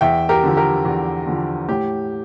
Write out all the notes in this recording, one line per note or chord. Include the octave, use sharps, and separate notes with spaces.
E2 E5 G5
G4 A#4
D3 F3
G4 A#4
E2
D3 F3
A2 G4